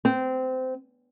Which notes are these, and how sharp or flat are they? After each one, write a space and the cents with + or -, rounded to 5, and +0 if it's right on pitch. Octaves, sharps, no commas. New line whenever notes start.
C4 -20